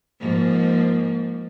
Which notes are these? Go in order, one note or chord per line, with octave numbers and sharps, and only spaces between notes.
G#2 F3 A#3